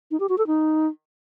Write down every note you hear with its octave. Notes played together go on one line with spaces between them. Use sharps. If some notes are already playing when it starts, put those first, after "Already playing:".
D#4
G4
F#4
A4
D#4